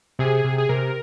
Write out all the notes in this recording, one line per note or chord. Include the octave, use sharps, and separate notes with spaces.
C3 G#4
C3
G#4
C3 A#4